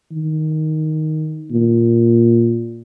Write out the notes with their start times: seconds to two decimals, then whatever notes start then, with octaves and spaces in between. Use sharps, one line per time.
0.12 D#3
1.50 A#2